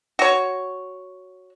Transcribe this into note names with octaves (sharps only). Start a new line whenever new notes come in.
F#4 C#5